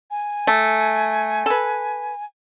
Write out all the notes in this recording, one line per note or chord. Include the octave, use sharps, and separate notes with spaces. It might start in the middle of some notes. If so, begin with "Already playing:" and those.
G#5
A3
A4 B4